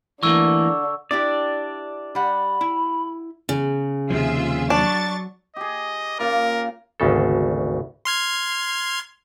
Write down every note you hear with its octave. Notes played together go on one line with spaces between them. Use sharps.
D3 E3 A3 A#3 C#6 E6
D4 E4 G4 D5
G3 F#5 B5
E4
C#3
D#2 C3 F3 F4 G#4 E5
F#3 D4 C#6 A6
G4 G#4 D#5
C#3 A#3 F4 A#4
G#1 D2 C#3 A4
C6 F6 G#6